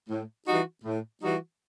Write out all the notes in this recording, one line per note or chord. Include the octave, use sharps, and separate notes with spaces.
A2
E3 G3 D#4 F#4
A2
E3 G3 D#4 F#4